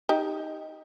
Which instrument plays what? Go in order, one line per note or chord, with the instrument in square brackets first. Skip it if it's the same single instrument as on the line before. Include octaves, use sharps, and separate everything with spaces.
[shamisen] D#4 G4